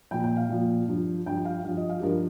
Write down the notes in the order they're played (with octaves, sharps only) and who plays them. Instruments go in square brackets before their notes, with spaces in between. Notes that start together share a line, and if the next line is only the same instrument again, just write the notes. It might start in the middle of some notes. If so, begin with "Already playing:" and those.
[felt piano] A#2 F3 G5
G5
F5
A#2 F3
G2 F3
G2 F3 G5
F5
G2 F3 F5
D#5
F5
G4
G2 F3 A#4